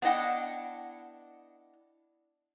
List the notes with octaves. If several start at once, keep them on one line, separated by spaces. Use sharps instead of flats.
B3 D4 E4 D#5 F#5 G5